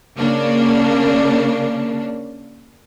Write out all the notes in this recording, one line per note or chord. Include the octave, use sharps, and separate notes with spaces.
C#3 A#3 D4